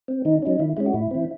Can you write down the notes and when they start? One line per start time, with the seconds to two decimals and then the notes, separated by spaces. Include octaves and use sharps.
0.08 C4
0.25 D#3 D#4
0.42 F#3 C#4 D#4
0.59 D#3 E4
0.77 G#3 C#4 E4
0.86 F#4
0.94 A2 E4
1.11 E3 C4